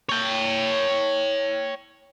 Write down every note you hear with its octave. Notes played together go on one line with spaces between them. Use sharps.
C#5 G5